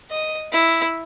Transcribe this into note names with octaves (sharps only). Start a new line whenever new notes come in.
D#5
E4